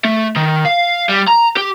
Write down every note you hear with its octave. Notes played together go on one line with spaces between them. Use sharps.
A3
D#3
F5
G3
A#5
G4